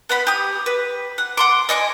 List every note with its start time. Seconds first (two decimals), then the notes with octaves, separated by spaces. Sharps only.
0.09 B3 F#5 B5
0.27 G4 D#6
0.66 B4
1.18 F#5
1.37 F#5 C6 D6
1.69 D#5 G#5 C#6 D6